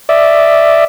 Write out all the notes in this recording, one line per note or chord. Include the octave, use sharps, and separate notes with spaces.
D5 E5